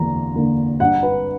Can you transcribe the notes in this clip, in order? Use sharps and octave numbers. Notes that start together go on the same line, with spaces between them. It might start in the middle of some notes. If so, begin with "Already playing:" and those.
Already playing: E2 D3 A#3 A#5
D3 A#3
G2 F#5
B4